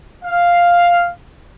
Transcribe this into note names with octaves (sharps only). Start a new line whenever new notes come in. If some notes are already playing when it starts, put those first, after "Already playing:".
F5